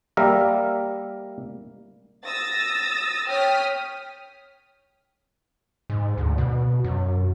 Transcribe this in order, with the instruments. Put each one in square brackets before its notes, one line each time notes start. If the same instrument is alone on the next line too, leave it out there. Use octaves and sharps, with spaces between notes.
[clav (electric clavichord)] G3 A#3 A#4 E5
[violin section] D#6 E6 A6 A#6
C#5 G5 D#6 F6 B6
[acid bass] G#2
D2
B2
F#2